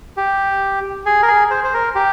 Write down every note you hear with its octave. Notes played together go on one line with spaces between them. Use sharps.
G4
G#4
A#4
G#4
C5
C5
A#4
G4